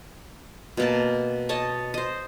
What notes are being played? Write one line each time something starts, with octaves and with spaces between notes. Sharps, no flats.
B2 A#3 A5
C#5 D#5 A5
C5 D#5